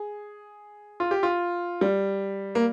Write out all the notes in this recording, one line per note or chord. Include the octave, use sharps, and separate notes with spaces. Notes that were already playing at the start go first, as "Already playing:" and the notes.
Already playing: G#4
F4
G4
F4
G3
A#3